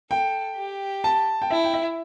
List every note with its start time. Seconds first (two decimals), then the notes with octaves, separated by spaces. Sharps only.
0.11 A4 G5
0.57 G4
1.04 A5
1.42 G5
1.51 E4 E5
1.64 G5
1.74 E5